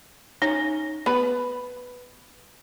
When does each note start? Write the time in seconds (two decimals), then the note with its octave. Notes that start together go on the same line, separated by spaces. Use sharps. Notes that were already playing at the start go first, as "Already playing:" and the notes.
0.42 C#4 D#4
1.06 B3 B4